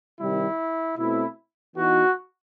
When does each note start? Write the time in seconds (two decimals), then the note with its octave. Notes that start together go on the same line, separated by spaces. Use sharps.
0.19 C3 D#3 G3 E4
0.98 B2 A3 C4 E4
1.77 E3 B3 D#4 F#4